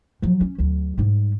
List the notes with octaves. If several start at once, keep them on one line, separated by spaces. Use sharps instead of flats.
F3 F#3
C#4
D2 F#3
G#2 G3